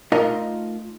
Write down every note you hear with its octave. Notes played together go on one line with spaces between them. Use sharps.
A3 D#4 F4 A#4 D#5 F5